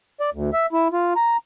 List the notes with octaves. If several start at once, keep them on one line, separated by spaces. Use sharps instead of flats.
D5
D2
E5
E4
F4
A#5